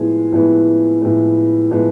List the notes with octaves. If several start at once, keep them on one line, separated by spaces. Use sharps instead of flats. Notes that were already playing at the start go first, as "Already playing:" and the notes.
Already playing: A2 F3 G#3 B3 G#5
A2 F3 G#3 B3
A2 F3 G#3 B3
A2 F3 G#3 B3